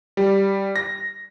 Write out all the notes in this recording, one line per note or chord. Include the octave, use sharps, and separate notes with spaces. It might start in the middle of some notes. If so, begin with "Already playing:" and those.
G3
A#6